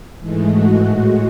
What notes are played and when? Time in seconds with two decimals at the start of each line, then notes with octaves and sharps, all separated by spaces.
0.20 G#2 E3 G#3 A3
0.51 F#4
0.83 A2 G#3 F#4